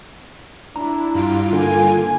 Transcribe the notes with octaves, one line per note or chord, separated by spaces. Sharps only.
D4 E4 A#5
G2 F4 D7
D3 A#3 G#5